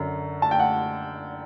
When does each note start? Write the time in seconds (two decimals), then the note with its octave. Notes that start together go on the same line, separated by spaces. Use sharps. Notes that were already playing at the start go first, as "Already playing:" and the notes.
Already playing: F#2 D3
0.42 A5
0.51 G5
0.59 F#5